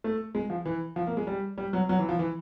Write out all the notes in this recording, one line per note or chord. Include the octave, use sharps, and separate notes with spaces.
A3
G#3
F3
E3
F3
A#3
G#3
G3
G3
F#3
F#3
E3
F3
E3